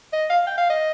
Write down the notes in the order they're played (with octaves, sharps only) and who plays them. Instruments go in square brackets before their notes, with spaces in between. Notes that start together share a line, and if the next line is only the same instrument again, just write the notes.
[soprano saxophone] D#5
F5
G5
F5
D#5